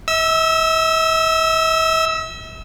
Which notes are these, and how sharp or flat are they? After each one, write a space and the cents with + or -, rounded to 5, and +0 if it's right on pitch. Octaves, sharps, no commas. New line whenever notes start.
E5 -45 E6 +0